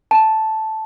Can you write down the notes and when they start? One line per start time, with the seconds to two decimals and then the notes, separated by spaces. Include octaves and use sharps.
0.11 A5